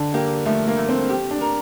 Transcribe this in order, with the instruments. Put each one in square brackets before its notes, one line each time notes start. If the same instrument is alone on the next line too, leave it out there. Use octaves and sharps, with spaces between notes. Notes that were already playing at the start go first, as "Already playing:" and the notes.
Already playing: [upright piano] D3 [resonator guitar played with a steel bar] D4
[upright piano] A#3 [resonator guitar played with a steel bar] G4
[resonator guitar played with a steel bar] F3 [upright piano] A3
[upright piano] A#3
[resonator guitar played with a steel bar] A3
[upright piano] C4
[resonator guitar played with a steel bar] G4
[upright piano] D4
[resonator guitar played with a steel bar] A#4